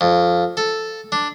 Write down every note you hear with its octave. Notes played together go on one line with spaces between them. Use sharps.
F2
A4
D4